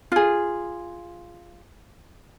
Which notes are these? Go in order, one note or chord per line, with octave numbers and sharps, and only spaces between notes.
F4 G#4